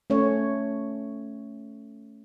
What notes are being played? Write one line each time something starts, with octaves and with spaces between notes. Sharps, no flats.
A3 C#4 C#5